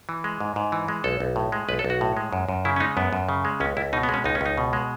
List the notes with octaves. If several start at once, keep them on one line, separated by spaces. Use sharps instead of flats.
E3
G#3
G#2
G#2
E3
G#3
B1 A4
B1
A2
G#3
B1 B4
A4
B1
F#4
A2
G#3
F#2
F#2
C#3 E4
C#4
G#3 D#4
F#2 B3
F#2
C#3
G#3
C#2 C#4
C#2 E4
B2 D#4
B3
G#3 C#4
C#2 D#4
C#4
C#2 D#4
B2
G#3